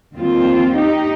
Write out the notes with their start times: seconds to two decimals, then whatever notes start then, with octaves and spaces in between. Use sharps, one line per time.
0.16 D#2 D#3 G3 C4 F4
0.75 D#4 G4